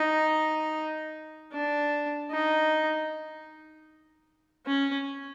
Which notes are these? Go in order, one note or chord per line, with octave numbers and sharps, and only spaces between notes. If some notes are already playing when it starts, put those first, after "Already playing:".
Already playing: D#4
D4
D#4
C#4